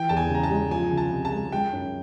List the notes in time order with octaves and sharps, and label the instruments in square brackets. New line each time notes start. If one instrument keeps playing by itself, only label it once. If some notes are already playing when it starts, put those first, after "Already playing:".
Already playing: [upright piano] E3 [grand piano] G5
[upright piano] E2 [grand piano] A5
[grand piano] G#5
[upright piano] C#3 [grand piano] A#5
[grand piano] A5
[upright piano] G#3
[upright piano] F3 [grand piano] G#5
[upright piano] C#2
[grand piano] A5
[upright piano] C3
[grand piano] A5
[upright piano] G#3
[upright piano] G#3 [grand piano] G5
[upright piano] F#2